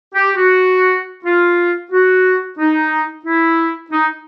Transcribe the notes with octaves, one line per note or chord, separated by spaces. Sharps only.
G4
F#4
F4
F#4
D#4
E4
D#4